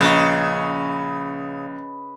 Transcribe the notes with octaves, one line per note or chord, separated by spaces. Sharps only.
A#1 C#3 B4 D#5 C#6